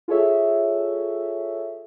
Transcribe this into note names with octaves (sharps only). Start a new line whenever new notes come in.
F4 G#4 A4 C#5 E5